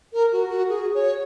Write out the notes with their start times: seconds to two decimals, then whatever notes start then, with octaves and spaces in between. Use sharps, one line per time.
0.13 A#4
0.32 F#4
0.50 F#4
0.69 G#4
0.94 C#5